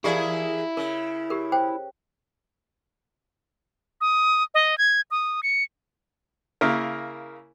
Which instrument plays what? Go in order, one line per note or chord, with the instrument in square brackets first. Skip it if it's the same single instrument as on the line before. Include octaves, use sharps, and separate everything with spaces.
[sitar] E3 G#4 A#4 [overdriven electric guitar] E4 [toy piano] G4 D5 F5
[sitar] C#3 [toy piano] A#4
[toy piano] G4 A#4
C5 G5
[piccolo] D#6
D#5
G#6
D#6
C#7
[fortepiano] C#3 A#3 E4 A#4